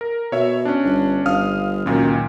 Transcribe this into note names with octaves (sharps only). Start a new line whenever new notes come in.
A#4
B2 C#5 E5
C#4 D4
G1
G1 F5 D#6 F6
C#2 F#2 A#2 D#3